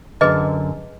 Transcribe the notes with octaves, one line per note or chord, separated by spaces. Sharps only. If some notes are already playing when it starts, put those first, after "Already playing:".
F#2 D3 G#4 B4 D#5